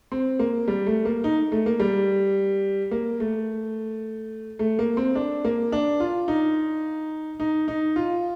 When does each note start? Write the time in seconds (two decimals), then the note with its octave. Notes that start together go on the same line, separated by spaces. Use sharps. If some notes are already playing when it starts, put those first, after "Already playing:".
0.12 C4
0.39 A#3
0.68 G3
0.87 A3
1.05 A#3
1.24 D#4
1.52 A3
1.66 A#3
1.80 G3
2.91 A#3
3.20 A3
4.59 A3
4.79 A#3
4.97 C4
5.15 D4
5.45 A#3
5.72 D4
6.00 F4
6.28 D#4
7.40 D#4
7.68 D#4
7.96 F4